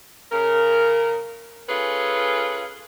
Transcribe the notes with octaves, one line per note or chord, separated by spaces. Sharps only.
C#3 A#4
C#4 F4 G#4 A4 B4